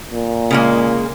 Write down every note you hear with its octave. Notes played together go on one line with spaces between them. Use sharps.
A#2
C#3 G#3 A#3